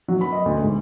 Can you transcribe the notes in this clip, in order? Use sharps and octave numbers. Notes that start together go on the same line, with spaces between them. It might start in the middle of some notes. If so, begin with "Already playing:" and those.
F#3
B5
D#5
D2
G#2